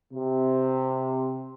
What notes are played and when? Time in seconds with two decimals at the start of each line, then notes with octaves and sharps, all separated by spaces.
0.13 C3